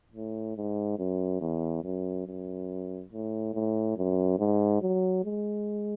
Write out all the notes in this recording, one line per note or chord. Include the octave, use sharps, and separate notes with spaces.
A2
G#2
F#2
E2
F#2
F#2
A2
A2
F#2
G#2
F#3
G#3